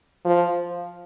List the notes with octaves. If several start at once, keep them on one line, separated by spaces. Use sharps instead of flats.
F3